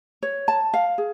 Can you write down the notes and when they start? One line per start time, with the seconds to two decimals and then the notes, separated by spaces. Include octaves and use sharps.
0.23 C#5
0.48 A5
0.74 F5
0.98 G#4